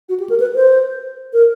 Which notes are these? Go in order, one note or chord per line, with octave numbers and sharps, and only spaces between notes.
F#4
G4
A#4
B4
C5
A#4